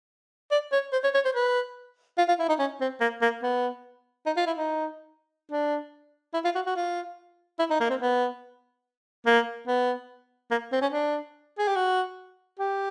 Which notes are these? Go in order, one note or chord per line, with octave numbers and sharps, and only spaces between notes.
D5
C#5
C5
C#5
C#5
C5
B4
F4
F4
E4
D#4
C#4
C4
A#3
A#3
B3
D#4
F4
E4
D#4
D4
E4
F4
F#4
F#4
F4
E4
D#4
A#3
C4
B3
A#3
B3
A#3
C4
C#4
D4
G#4
G4
F#4
G4